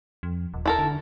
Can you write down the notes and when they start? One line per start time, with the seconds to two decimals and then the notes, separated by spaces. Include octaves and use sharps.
0.23 F2
0.54 D#1
0.66 E4 A4 A#4
0.79 D3